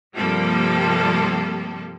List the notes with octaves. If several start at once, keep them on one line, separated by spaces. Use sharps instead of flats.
G2 C3 F3 G3 A#3 A4